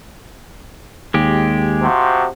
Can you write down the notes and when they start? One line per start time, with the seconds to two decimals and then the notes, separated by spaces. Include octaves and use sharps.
1.14 D#2 G#3 G4
1.82 C3 F3 F#4